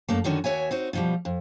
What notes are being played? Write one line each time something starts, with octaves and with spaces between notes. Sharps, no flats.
F#2 A3 A#3
F#2 D3 D#3 C#4 F#4
D#2 F#4 C#5 E5 G#5
C4 D#4 F#4
B2 F3 G3
F2